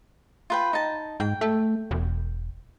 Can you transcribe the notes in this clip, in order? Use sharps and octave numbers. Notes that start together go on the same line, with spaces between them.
F4 B4 G5
D#4 A5
G#2 G5
A3
E1